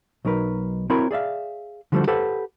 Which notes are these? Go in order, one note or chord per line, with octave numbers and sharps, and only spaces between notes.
B1 F#3 D#4 A#4 B4
C4 E4 F#4 A#4 C#5 B5
G#4 D5 E5 F5
D3 F3 G3 A3 F#4 C5
G4 A4 B4 C5 F#5